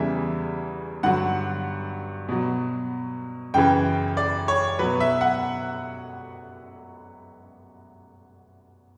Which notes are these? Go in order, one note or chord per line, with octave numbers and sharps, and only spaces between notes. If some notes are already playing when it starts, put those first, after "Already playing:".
Already playing: E2 C#3 E3 G3 E5
G2 D3 F#3 F#5
B2 F#3
F#2 C#3 E3 G5
D5
C#5
B2 F#3 B4
E5
F#5